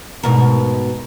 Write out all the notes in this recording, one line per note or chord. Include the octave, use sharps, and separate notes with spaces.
G#2 B2 A#4